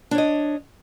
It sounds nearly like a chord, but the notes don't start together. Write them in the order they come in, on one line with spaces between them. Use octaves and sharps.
D4 C#5 D#5